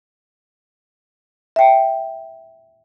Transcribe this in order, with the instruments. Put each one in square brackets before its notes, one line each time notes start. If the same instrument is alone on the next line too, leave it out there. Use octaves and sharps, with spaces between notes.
[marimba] E5 G5